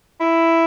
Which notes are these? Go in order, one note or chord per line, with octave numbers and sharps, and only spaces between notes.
E4